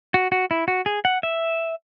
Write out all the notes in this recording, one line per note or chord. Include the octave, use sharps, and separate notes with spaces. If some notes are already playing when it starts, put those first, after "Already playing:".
F#4
F#4
E4
F#4
G#4
F#5
E5